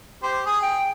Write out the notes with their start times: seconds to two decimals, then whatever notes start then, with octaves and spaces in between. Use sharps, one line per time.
0.23 G4 C5
0.46 G#4 D#6
0.62 G5